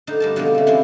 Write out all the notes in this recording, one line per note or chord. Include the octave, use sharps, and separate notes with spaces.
D3 D#4 C5
G2 A#4 A5
B2 D3 F3 G#3 A#3 C4
C#3 A3
C3 E3 G#3 C4 C#4 F4